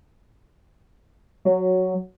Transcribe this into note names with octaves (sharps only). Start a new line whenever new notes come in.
F#3